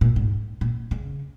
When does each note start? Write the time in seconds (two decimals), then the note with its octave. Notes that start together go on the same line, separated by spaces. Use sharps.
0.01 A#2
0.16 G#2
0.61 A#2
0.91 C#3